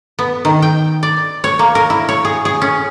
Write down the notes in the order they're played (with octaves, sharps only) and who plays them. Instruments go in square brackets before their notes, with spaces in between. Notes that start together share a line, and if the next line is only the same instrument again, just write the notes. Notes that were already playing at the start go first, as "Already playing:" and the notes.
[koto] B3
D#3
G5
D5
C#5
A#3
A#4
E4
C#5
G#4
G#4
C#4